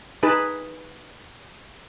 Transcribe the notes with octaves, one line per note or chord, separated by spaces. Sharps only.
D#4 G#4 B4 A5